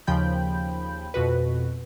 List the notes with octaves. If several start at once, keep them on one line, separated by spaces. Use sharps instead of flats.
D#2 C#3 F3 G5 B5 G6
F2 B2 F#4 B4